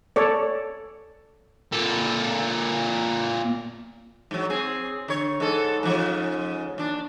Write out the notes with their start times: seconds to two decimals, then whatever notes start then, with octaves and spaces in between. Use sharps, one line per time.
0.16 A4 C#5 D5
1.72 A#2 A4
4.31 G#2 F#3
4.50 C4 G#4
5.08 D3 C#5
5.40 G#2 A4
5.83 G#2 C#3 F3
6.78 D#2 D4